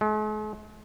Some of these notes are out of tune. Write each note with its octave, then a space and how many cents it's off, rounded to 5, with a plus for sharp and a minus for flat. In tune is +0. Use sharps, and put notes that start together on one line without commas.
G#3 +45